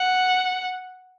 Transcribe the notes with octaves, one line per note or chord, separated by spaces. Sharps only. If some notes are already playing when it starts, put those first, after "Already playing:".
Already playing: F#5